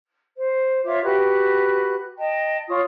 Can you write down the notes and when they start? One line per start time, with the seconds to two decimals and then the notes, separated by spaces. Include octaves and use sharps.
0.38 C5
0.85 F4 C#5 E5 D6
1.04 F#4 G4 B4 F#6
2.18 D#5 G5 A5
2.68 F4 C#5 C#6 D#6